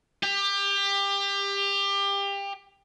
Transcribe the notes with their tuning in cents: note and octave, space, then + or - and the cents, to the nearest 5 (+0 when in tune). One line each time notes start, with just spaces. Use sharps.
G4 +25